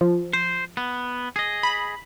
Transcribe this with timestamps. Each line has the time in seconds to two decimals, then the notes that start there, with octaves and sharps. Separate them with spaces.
0.01 F3
0.33 C5
0.77 B3
1.36 G#4 D#5
1.63 B5